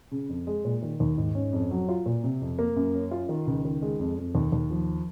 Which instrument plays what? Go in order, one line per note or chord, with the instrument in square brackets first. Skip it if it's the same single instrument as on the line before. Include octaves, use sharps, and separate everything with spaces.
[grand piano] C#3
F2
G#3
A#2
D#3
D#2
G#2
C#4
F2
F#3
F4
A#2
C3
F2
A#3
F#2
C#4
F4
D#3
C#2
D#3
G#3
F2
F2
D#2
D#2
F3